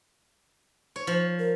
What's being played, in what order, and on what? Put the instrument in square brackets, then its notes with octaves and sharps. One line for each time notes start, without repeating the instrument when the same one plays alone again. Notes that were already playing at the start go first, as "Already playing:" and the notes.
[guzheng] C#5
F3
[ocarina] A#4